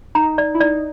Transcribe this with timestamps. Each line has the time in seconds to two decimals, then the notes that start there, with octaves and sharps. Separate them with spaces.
0.15 D#4 A#5
0.38 D5
0.54 E4
0.60 D#4 D5